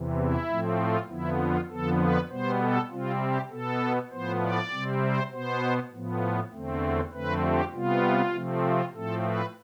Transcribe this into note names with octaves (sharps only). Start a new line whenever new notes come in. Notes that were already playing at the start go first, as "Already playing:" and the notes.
Already playing: E2 C3 E3
E4
A2 F3 A3 C4
F4
F2 D3 F3 B3 E4
F4
F2 D3 F3 B3 A4
B4
B2 G3 B3 C5
A4
C3 G3 C4 F4
G4
B2 B3 A4
A2 F3 B3 C5
D5
C3 G3 C4
C5
B2 B3 C5
A2 F3 B3
E2 D3 A3 C4
F2 D3 A3 C4 B4
G4
C3 G3 B3 F4
C3 F3 A3 C4
F4
A2 F3 A3 C4 A4
B4